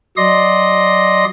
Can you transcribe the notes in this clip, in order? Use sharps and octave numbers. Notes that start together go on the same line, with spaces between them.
F#3 D5 D#5 C6 A#6